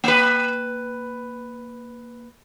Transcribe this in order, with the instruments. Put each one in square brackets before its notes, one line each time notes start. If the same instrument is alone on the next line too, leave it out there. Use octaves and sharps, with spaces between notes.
[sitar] A#3 B4